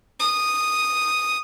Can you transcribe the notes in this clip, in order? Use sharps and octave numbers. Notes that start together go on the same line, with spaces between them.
D#6